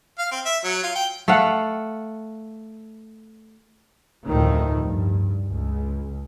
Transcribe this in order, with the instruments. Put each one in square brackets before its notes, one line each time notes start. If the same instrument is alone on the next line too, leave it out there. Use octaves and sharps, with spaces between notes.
[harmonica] F5
C4
E5
F#3
F4
G5
[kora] A3 A4 F5 F#5
[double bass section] F1 D2 A2 D#3 F3
G2
C#2